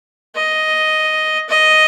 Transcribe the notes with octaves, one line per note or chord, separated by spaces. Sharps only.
D#5
D#5